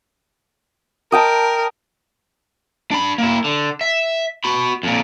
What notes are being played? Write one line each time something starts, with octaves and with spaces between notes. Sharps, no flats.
A#4 D#5 G5 A5
D4 B5
A#3 E4
D3
E5
F#4 B5
F2 A#2